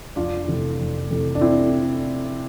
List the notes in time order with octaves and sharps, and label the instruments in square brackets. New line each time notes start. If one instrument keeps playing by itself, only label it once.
[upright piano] F1 D4 F4
F2 C3 E3 A3
F1
F2 C3 E3 A3
D4
C4 E4